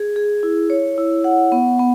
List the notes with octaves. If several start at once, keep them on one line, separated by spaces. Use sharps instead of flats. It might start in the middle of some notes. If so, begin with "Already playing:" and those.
Already playing: G#4
G#4
E4
C#5
E4
F#5
B3
B3